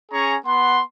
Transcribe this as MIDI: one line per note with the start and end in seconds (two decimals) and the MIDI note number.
0.11 0.36 61
0.11 0.36 68
0.11 0.36 82
0.11 0.36 85
0.45 0.81 59
0.45 0.81 78
0.45 0.81 84